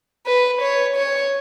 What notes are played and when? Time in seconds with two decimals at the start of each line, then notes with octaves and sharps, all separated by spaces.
0.26 B4
0.62 C#5
0.96 C#5